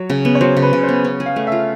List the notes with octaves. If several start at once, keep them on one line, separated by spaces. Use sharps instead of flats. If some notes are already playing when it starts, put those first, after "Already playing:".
Already playing: F#3 C#5
C#3
B3
C#5
F#3 C5
C#3
B4
C#3
C5
B3
C#4
G#4
F5
A3
E5
F4